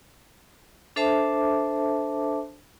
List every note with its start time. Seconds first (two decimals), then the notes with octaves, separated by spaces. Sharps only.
0.96 D4 A4 C5 E5 A5 D6